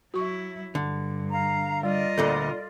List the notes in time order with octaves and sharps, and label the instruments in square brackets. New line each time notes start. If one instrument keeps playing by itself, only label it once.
[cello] F#3 E4 [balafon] F#4 C#6
[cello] G2 [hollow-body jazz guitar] D3
[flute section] F5 A#5
[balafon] G3 [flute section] F4 D5 [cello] A#4 D#5
[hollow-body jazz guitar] D2 A#2 D3 [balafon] A4